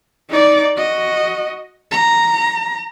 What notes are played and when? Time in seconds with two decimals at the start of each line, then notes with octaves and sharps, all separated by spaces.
0.30 D#4 D5
0.77 F#4 D#5
1.91 A#5